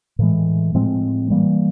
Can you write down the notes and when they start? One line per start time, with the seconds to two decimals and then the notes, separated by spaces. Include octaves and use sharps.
0.19 A2 E3 G#3
0.74 A2 F3 G#3 C4
1.30 E3 G3 A#3